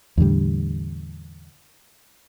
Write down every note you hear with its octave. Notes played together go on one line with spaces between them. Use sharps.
E2 A2 D3 G3